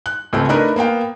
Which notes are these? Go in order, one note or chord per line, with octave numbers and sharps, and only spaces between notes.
F#6
C#2 A3 C4
A3 D4 D#4 A#4 B4
A#3 B3 F5 G5